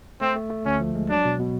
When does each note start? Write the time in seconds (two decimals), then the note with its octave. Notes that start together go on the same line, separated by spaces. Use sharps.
0.21 A3 C4
0.36 A3
0.50 A3
0.65 D2 C#4
0.80 F3
0.95 G#3
1.10 F#3 D4
1.25 B2
1.39 B2